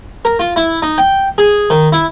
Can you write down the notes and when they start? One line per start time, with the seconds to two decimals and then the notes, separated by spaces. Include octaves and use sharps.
0.25 A#4
0.39 F4
0.56 E4
0.82 D#4
0.98 G5
1.38 G#4
1.70 D#3
1.92 E4